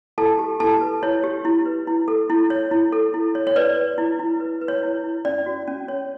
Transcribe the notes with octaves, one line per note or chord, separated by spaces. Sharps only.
E4 A4 A5
G4
E4 A4 A5
B4
E4 C#5
G4
E4
B4
E4
A4
E4
C#5
E4
A4
E4
C#5
C#5
B4 D5
B4
E4
E4
B4
B4
C#5
E4
E4
C#4 D5
F#4
C#4
C#5